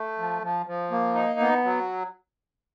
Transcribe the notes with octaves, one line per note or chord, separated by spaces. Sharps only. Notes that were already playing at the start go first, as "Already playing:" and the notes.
Already playing: A3
F3
F3
F3
A#3
D#4
B3
F#3